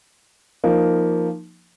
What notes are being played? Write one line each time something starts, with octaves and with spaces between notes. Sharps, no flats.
F3 A#3 D#4